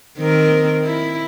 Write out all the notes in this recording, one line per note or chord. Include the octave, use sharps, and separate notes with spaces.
D#3 C4 A#4
E4